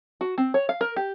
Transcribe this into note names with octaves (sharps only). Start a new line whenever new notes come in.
F#4
C4
C#5
F5
A#4
G4